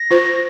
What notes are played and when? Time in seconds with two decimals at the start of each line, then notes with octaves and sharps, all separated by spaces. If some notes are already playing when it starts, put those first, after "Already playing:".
Already playing: A#6
0.11 F4 C5